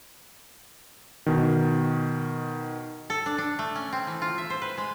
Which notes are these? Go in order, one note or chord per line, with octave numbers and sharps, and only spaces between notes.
B2 D#3
A4
D4
D4
A3
C#4
C4
E3
F4
E5
C5
B4
G#3